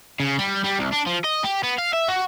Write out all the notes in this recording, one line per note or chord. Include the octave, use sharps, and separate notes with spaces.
C#3
G3
G3
C2
D4
F3
D#5
G4
B3
F5
E5
F#4